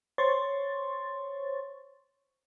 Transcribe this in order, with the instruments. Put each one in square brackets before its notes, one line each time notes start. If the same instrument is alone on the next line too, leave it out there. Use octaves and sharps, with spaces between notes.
[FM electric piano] C5 C#5 C6 C#6 A6